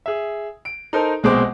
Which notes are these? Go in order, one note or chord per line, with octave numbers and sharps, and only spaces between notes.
G#4 E5
D7
D#4 A4 A#4 C5
A#1 B2 G#3 C4 C5 D6